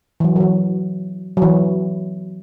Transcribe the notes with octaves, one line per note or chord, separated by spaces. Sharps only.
E3
F#3
F#3
E3
F#3
E3